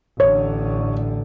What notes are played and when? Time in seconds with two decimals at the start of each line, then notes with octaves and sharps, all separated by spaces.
0.20 A1 D3 C#5